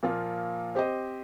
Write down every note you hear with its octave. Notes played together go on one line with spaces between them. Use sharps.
A#2 F3 A#3 F4
C4 G4 C5 D#5